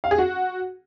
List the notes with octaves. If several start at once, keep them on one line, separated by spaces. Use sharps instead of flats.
F5
G#4
F#4